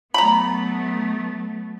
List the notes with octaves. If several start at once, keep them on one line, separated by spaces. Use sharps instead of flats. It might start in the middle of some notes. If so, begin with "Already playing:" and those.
F#3 A3 B3 A#5 B5